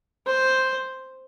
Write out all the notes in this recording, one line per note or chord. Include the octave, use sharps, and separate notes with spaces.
C5